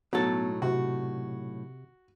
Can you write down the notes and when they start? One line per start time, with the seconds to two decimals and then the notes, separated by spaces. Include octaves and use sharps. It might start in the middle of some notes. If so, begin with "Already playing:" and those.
0.13 B1 A2 F#3 B3 A4
0.62 C3 F#4